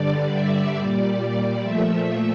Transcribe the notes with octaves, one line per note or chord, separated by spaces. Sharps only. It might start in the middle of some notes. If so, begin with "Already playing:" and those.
Already playing: G2 D3 G3 D5
E5
A#2 G3 D5
A#2 F3 A3 E5